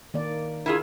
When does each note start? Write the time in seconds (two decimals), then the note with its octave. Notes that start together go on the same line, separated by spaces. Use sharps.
0.14 D#3 A#3 D5
0.66 E4 F4 G#4 A#4